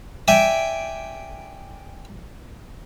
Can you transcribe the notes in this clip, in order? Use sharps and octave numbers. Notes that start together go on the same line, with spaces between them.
D5 E5 G5 G#5